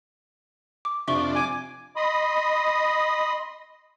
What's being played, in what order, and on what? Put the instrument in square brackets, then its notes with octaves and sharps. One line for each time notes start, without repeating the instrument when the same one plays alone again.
[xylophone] D6
[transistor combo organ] F2 D4 [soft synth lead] C3 [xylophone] E5 C#6 G7
[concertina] G#5 D6
[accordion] D#5 B5 C6 D#6